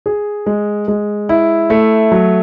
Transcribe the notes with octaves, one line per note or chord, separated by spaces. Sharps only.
G#4
G#3
G#3
E4
A3
F#3